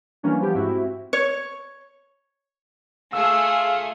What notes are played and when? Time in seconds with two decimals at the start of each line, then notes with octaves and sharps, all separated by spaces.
0.23 E3 G3 A#3 C#4 D4
0.39 F3 B3 G4
0.55 G#2 C4 E4 F#4 E5
1.13 C#5
3.13 A3 F4 G#4 F5 E6